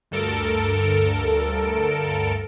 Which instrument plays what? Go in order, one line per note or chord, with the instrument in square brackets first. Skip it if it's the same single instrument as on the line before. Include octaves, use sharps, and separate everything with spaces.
[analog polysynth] D2 G2 A4 A#4 D7